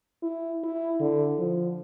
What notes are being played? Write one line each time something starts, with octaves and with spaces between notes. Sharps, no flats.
E4
E4
D3
F3